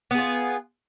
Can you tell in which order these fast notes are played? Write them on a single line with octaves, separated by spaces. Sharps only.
B3 G#4 F4